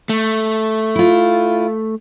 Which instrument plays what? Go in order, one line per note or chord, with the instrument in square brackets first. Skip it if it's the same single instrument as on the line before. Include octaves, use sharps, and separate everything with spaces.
[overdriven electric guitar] A3
[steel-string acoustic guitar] E4 F4